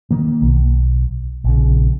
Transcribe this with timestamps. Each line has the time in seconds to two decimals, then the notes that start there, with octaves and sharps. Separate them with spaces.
0.11 D#3 A#3
0.41 B1
1.44 A#1 C#3